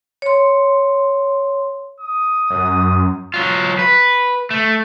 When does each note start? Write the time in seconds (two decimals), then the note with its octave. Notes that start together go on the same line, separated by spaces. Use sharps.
0.22 C#5 C6
2.01 D#6
2.51 F#2
3.34 F#3 F4
3.79 B4
4.51 A3